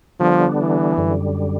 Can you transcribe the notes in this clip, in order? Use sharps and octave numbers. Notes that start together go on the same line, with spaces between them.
D3 F3 G3 B3 D4
E3
F#2 D3 G3